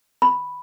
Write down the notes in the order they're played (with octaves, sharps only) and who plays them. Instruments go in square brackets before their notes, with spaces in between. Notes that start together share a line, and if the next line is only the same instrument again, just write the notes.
[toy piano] B5